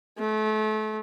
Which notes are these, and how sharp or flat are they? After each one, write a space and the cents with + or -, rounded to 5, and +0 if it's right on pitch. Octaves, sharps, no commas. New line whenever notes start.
A3 -30